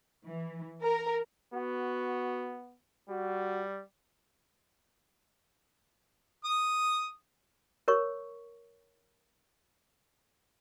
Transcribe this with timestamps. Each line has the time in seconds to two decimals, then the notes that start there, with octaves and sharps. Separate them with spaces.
0.25 E3
0.83 A#4
1.54 B3 F#4
3.09 G3 F#4
6.44 D#6
7.88 A#4 C#5 C#6